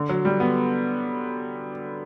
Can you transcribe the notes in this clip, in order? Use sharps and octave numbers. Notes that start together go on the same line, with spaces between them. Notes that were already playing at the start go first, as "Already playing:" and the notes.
Already playing: D3
F#3
G3
B3